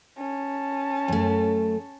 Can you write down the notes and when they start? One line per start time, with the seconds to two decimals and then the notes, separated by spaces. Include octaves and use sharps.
0.18 C#4 A5
1.08 F#2 A3